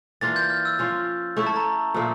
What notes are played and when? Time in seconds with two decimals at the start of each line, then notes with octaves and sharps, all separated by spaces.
0.21 E3 A#3 D4 F4 A6
0.36 G6
0.50 F6
0.65 E6
0.79 F3 C#4 F4
1.37 A3 E4 A4 C#5 C#6
1.47 A5
1.56 A#5
1.94 A#2 F3 A3